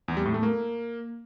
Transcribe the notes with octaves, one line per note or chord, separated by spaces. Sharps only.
E2
G3
A2
A3
A#3